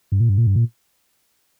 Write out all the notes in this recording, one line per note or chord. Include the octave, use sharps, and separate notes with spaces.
G2
A#2
G2
A#2
G2
A#2